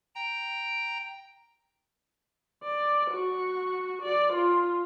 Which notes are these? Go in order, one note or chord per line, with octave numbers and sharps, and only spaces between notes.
G5 A#5
D5
F#4 C#6
D5
F4